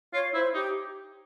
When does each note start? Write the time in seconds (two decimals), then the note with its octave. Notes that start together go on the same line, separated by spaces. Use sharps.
0.13 F4 C#5
0.34 E4 C5
0.54 D#4 G4